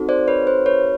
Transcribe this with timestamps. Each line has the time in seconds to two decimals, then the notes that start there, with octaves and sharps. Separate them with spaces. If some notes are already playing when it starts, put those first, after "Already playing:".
Already playing: C4 D#4 F#4 A4
0.09 C5 D5
0.28 B4 C#5
0.47 C5
0.66 B4 C#5